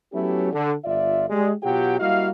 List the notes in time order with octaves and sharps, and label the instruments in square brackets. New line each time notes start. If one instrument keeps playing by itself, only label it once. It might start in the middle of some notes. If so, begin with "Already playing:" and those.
[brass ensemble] F#3 A3 B3 C#4 E4 G4
D3
G1 F4 D5 E5
G#3 G4 D5
B2 F#3 F4 G4 F#5 G5
G3 A#3 E4 F#4 D#5 F5